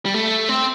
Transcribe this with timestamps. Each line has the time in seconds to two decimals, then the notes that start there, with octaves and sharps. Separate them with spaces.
0.06 G3
0.14 A3
0.49 C4